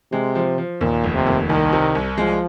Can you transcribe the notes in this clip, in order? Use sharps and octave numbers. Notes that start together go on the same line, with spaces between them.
C3 G#3
F3
F3
D#2 A#2
F1
C3
D#2
C2 D#3
C3
C2
F3 G#3